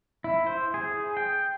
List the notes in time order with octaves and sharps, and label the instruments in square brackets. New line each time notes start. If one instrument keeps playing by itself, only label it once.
[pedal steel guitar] E4
C5
G#4
G5